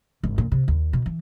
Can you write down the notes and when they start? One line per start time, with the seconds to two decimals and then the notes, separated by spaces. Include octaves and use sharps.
0.23 G#1
0.38 A#2
0.52 C3
0.68 D#2
0.93 B2
1.06 E3